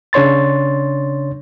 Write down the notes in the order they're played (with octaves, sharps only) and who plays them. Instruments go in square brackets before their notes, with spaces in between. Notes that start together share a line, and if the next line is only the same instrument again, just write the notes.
[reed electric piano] C#3 D4 C#5 C6 A6